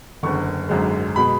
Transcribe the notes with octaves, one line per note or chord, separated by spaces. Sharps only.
F#1 E2 D3 C#6
G#1 F#2 D3 G#3
B2 G#3 B5